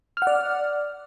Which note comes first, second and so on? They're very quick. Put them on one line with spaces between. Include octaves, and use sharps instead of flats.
F6 F#5 D5